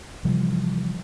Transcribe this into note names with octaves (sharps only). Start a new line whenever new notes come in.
C3 E3 F3 G3